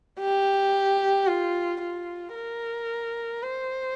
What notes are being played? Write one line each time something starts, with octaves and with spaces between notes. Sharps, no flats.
G4
F4
F4
A#4
C5